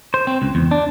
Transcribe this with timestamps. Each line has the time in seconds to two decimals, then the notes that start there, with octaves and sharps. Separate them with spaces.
0.14 C5
0.27 C4
0.42 C#2
0.55 E2
0.71 D4